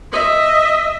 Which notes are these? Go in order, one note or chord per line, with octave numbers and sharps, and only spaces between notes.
D#5 E5